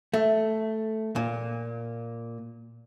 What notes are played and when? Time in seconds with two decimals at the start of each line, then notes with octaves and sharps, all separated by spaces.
0.14 A3
1.16 A#2